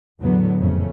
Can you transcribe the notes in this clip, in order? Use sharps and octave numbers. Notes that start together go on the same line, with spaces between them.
E2 A2 D3 F#3 B3
F#1 F2 A#2 C#3 A3 C#4